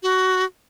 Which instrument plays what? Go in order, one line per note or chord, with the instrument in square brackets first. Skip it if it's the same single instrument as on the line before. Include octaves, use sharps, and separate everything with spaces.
[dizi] F#4